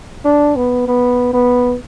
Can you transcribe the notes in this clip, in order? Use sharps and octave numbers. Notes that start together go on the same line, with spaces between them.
D4
B3
B3
B3